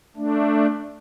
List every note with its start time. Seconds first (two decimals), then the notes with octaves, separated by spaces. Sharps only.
0.17 A3 D4